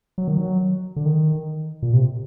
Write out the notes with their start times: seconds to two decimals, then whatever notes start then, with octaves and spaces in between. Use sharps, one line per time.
0.18 F#3
0.28 D#3
0.37 F#3
0.96 D3
1.06 D#3
1.82 A#2
1.93 C3